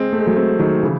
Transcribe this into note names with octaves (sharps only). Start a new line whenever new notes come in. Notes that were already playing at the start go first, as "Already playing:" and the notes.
Already playing: G#3 C4
A3
G#3
F#3 A3
G#3 C4
D#3 F#3
C#3 E3